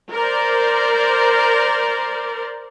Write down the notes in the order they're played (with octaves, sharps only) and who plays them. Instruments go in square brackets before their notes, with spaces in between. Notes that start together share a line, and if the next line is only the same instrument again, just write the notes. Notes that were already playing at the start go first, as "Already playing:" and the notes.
[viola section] A#4 C5 D5